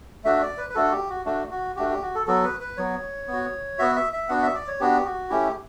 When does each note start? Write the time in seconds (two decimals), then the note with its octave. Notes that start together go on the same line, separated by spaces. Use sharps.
0.24 A3 D4 F#4 E5
0.42 D5
0.58 B4
0.70 B4
0.75 A3 D4 F#4 A4
0.92 G4
1.10 F#4
1.26 A3 D4 F#4
1.51 F#4
1.76 A3 D4 F#4 G4
1.90 G4
2.02 F#4
2.15 A4
2.27 F#3 B3 F#4 A4
2.44 B4
2.60 B4
2.77 F#3 B3 F#4 C#5
3.28 B3
3.33 F#4
3.79 B3 F#4 E5
3.96 E5
4.13 E5
4.29 B3 D4 F#4 F#5
4.43 E5
4.55 D5
4.68 C#5
4.80 B3 D4 F#4 G4
5.05 F#4
5.30 A3 C#4 E4 G4